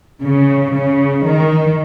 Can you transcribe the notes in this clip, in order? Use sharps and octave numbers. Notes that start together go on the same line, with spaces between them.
C#3
C#3
D#3